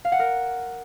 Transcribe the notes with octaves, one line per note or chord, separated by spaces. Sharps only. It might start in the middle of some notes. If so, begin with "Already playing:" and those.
F5
F#5
A#4